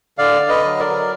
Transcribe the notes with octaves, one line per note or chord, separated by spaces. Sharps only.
D3 D5 F5
D3
B4 D#5
F#3
A#4 D5
F#3